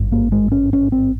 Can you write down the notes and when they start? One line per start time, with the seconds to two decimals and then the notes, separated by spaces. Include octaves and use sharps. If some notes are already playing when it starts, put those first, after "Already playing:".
Already playing: G#1 G2
0.12 A#3
0.32 G#3
0.52 C#4
0.73 C#4
0.92 C4